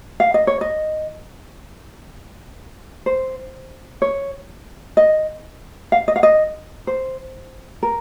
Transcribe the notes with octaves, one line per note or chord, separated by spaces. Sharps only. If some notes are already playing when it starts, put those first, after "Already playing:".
F5
D#5
C#5
D#5
C5
C#5
D#5
F5
D#5
F5
D#5
C5
A#4